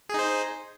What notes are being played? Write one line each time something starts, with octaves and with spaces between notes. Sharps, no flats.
D#4 G#4 C5